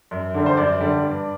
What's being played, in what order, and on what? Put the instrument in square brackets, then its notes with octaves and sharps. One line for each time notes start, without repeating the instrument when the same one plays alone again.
[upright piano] F#2
D3 G3
C5
F#2 D5
D3 G3
G2